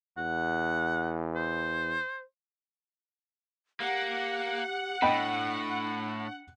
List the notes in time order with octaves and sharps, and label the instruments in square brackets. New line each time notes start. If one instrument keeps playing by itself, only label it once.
[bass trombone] E2 [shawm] F#5
[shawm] C5
[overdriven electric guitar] A#3 [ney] G4 [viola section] F#5
[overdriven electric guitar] A2 [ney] D4 [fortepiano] D#5 G5 B5